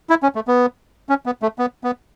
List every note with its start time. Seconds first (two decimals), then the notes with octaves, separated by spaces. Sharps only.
0.10 E4
0.23 C#4
0.35 A3
0.48 B3
1.09 C#4
1.26 B3
1.42 A3
1.59 B3
1.84 B3